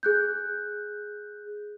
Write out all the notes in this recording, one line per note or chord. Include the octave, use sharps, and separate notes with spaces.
G#4 F#6 G6